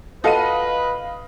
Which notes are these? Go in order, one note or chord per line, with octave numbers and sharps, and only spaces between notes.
F4 F#4 A4 B4 D#5 F5 D#7